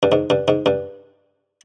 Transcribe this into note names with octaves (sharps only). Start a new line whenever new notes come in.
G2
G#2
G2
G#2
G2